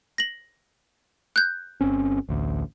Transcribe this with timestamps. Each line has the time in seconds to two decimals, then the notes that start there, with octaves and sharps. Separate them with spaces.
0.18 A#6 F#7
1.36 F#6 G6
1.81 G1 C4 C#4
2.29 A1 D2